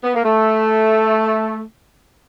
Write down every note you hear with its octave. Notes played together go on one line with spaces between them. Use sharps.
B3
A#3
A3